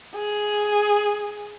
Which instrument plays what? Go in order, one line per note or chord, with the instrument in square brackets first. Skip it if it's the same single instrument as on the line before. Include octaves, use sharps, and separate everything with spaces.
[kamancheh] G#4